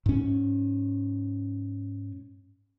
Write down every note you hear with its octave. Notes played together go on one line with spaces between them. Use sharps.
G#2 C#4